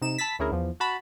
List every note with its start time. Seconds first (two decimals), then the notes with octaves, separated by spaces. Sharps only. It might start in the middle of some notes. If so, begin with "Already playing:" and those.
0.01 C3 D#4 E7
0.18 A5 B5 E6 A6 B6
0.39 D2 C#4 E4 G#4 A#4
0.51 E2 E3 F3
0.80 F#4 A5 B5